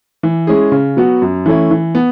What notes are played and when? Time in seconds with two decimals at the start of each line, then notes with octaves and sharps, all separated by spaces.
0.23 E3
0.47 G#3 C#4 E4 G#4
0.72 C#3
0.97 F#3 B3 F#4
1.22 F#2
1.46 E3 A3 C#4 E4
1.71 E3
1.95 B3